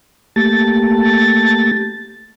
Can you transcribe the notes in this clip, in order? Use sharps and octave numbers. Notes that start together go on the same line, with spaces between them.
A3 A#3 G4 A5 A6